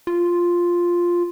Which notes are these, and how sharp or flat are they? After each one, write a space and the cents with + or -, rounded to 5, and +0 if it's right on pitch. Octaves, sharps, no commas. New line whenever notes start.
F4 +0